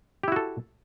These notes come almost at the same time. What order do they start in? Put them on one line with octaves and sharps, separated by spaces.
G4 E4 F#4 A4